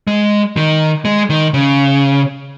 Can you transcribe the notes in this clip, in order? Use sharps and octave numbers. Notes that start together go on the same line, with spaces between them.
G#3
D#3
G#3
D#3
C#3